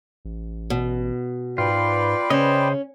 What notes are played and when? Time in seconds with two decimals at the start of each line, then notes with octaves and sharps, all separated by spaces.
0.25 A1
0.70 B2
1.58 G#2 F4 B4 D5 G5
2.30 C#3 C#4 C5 D#5